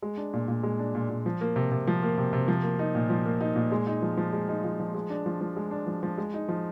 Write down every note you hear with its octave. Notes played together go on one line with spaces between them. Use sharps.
G#3
D4
A#2
A#2
G#3
D4
A#2
A#2
F3
A#3
C3
C3
F3
A#3
C3
C3
F3
A#3
D#4
A#2
F3
A#3
D#4
A#2
G#3
D#4
F3
F3
G#3
D#4
F3
F3
G#3
D4
F3
F3
G#3
D4
F3
F3
G#3
D#4
F3